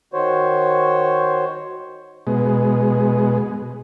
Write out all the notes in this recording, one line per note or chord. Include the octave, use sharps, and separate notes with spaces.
D#3 F#4 C5 C#5
B2 G#3